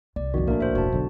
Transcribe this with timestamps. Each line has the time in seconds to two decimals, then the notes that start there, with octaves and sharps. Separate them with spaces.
0.16 C2 D5
0.34 G1 F2 D#3 F#4
0.47 A#1 A2 A#3 D4 A#4 E5
0.60 C#2 F#4 C5 E5
0.75 E1 F#2 F#4 A5
0.92 B1 D3 D4